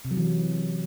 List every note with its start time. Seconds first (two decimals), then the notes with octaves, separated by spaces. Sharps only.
0.05 C3
0.11 F#3
0.17 E3